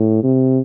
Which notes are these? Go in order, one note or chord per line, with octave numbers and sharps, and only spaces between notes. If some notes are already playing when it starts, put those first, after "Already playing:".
Already playing: A2
C3